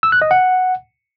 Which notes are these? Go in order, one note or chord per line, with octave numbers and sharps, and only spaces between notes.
E6
F#6
D#5
F#5